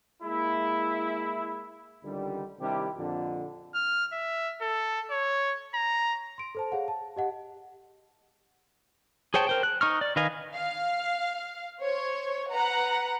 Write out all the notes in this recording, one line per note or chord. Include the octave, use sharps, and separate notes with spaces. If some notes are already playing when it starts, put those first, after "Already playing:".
G#3 A#3 E4
C#2 D3 D#3 G3
C3 D#3 G3 D4 E4 G4
F2 A#2 D3
F6
E5
A4
C#5
A#5
C6 D7
A4 C5 A5
G#4 C#5 F5 F#5
A5
G4 D#5 F#5
G#4 C5 C#5 G5 A5
A#4 C5 G5
F#6
D#4 C#6 F6
D5
D#3 B4 D#5 F5 G#5
F5
C5 C#5
B4 F#5 A#5